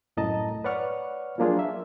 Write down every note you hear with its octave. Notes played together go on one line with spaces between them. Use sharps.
C2 F#2 A2 D#5 A5 A#5
B4 C#5 D5 F#5 C#6 F6
F3 F#3 A#3 D4 F4 G#4
E5